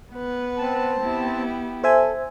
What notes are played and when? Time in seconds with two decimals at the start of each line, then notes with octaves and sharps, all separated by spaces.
0.13 B3 B4 F#5
0.58 C4 A5
1.01 B3 E4 G4
1.84 A4 C5 E5 G#5